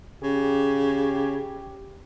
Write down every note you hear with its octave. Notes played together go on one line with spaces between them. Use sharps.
C#3 G4